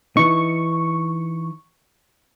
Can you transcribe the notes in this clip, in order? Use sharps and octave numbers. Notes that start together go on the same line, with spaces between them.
E3 D#4 C#6